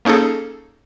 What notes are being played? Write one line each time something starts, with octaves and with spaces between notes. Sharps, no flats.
A#3 C#4 D#4 G#4 A4